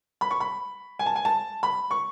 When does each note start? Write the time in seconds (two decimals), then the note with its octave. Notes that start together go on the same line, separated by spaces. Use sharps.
0.21 B5
0.31 C#6
0.40 B5
0.99 G#5
1.06 A5
1.16 G#5
1.25 A5
1.63 B5
1.91 C#6